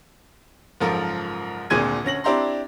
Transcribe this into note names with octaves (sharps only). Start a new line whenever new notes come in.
F#1 G#2 F3 F4 A4 A#4
G#1 D2 A#2 G#4 G#6 D#7
D2 C#4 A#6 F#7
C4 D4 E4 G4 A#5 C6